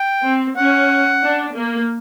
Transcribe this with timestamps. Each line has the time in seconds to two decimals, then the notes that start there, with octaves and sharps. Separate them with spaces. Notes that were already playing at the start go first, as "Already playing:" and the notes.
Already playing: G5
0.23 C4
0.56 C#4 F#5
1.22 D4
1.54 A#3